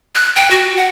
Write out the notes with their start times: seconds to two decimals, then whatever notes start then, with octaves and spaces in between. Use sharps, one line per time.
0.15 F#6
0.36 G5
0.51 F#4
0.77 F#5